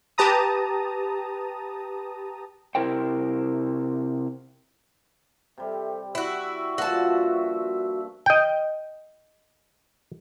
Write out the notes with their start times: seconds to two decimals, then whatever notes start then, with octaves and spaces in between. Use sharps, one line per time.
0.18 G4 B4 A5 A#5 D#6
2.75 C3 E4 A#4 C5 G5
5.58 C3 G3 A4 C5 E5
6.15 E4 F#4 E5 C#6 E6
6.78 G2 A#2 F3 F#4 A5
8.26 D#5 G5